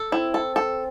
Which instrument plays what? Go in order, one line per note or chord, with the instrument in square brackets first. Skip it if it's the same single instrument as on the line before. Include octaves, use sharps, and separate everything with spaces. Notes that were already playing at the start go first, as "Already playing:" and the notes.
Already playing: [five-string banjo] A4
[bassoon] C4 [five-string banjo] E4
[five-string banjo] A4
A4